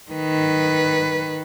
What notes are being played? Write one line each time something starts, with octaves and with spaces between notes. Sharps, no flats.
D#3 B4